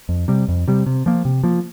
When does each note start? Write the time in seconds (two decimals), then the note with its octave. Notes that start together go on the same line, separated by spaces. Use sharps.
0.09 F2
0.28 C3 G3
0.48 F2
0.68 C3 G3
0.86 C3
1.06 F3 A#3
1.25 C3
1.43 F3 A#3